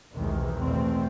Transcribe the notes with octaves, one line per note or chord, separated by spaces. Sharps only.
B1 E2 C3 D#3 E3 G#3
E2 B2 A3 C4